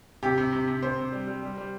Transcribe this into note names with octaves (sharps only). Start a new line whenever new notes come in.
C3 G4
C3
C3
C3
C3 C5
C3
G3
G3
G3
G3